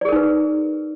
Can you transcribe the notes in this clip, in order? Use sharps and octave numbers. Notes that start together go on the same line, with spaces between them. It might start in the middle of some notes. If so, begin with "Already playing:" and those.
D#4 G#4 A#4 B4 D5